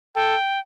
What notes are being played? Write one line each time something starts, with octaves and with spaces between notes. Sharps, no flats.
A4 G5